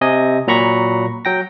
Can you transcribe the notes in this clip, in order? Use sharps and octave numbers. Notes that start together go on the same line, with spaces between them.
C3 D#5 G#5
A#2 F#3 A#5 B5 C#6 A#6
F#3 G5 A#6